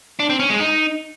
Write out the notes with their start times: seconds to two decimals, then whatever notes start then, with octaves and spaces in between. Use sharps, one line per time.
0.19 D4
0.30 C4
0.40 C#4
0.50 G#3
0.60 D#4